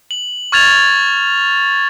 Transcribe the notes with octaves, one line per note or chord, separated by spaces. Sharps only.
F#7
C#6 F6 G#6 A6 F7